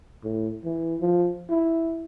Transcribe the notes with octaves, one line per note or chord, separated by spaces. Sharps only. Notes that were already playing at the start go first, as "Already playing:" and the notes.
A2
E3
F3
E4